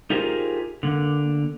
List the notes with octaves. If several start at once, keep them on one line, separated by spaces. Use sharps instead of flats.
D#4 F4 G4 G#4 A#4 C5
D3 A#3